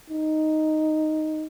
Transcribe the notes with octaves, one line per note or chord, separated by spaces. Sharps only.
D#4